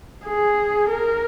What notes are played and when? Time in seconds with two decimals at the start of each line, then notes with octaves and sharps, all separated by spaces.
0.25 G#4
0.90 A#4